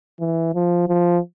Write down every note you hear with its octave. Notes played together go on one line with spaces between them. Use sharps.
E3
F3
F3